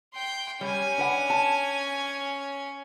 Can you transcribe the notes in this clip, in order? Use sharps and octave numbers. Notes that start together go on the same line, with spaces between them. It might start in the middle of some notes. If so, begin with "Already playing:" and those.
G5 C6
G3 C#4 G#5
D4 B4 F#5
A5